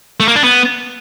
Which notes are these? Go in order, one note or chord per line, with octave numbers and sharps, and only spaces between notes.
A3
A#3
D4
B3